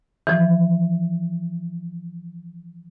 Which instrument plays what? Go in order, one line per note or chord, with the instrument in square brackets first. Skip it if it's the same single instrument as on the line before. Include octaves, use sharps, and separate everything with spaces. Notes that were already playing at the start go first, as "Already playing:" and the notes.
[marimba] E3 F3